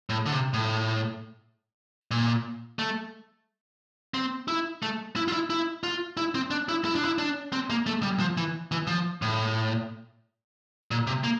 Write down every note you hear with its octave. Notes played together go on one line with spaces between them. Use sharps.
A2
D3
C3
A2
A#2
A3
C4
E4
A3
E4
F4
E4
E4
F4
E4
C4
D4
E4
E4
D4
E4
D4
C4
A#3
A3
G3
F3
E3
E3
F3
A2
A#2
C3
A#3